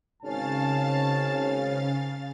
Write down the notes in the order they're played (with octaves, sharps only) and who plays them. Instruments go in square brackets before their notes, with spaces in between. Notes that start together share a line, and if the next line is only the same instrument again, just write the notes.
[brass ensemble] G#1 G#2 C#4 [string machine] C#3 F5 A6 [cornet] A5